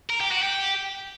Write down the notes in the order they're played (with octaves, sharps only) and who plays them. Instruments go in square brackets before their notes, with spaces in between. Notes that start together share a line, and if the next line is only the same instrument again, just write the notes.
[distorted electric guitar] A#4
G4
F#4
G4